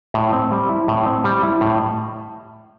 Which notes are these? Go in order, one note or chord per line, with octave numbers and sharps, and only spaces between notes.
A2
C4
G3
E4
A2
C4
G3
E4
A2